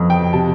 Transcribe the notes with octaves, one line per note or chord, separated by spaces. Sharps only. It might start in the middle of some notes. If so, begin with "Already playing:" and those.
Already playing: F2 B3
G5
C3 A5